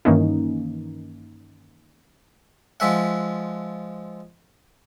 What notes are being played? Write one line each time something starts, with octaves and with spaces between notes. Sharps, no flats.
G2 D#3 E3 A#3 C#4 D#4
F3 G#3 E5 F#5